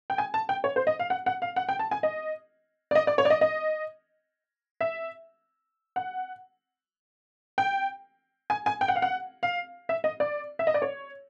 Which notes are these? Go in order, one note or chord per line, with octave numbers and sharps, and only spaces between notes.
G5
G#5
A5
G5
C#5
C5
D#5
F5
F#5
F#5
F5
F#5
G5
A5
G#5
D#5
D5
D#5
D5
C#5
D5
D#5
D#5
E5
F#5
G5
G#5
G#5
G5
F#5
F5
F#5
F5
E5
D#5
D5
E5
D#5
D5
C#5